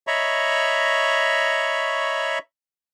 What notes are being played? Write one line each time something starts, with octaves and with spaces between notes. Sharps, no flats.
C#5 D#5 E5 A#5 B5 C#6